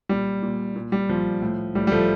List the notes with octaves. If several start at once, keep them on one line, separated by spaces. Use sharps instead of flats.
A#2 G3
A#2
A#2
G3
A#2 F3
A2
A2 G3
G3
F3 A3